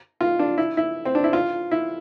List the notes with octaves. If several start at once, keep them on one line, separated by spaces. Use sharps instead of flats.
F4
D4
E4
E4
C4
D4
E4
F4
E4